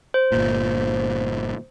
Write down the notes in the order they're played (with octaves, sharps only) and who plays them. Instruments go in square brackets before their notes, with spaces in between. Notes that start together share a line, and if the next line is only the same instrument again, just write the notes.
[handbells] C5
[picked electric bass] G1 A#2